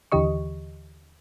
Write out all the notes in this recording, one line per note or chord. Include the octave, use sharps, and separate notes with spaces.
D#2 D3 E3 G4 D#5 C#6